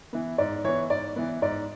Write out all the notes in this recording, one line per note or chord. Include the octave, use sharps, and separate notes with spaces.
E3 B3
G#2 D5
E3 B3 C#5
G#2 D5
E3 B3
G#2 D5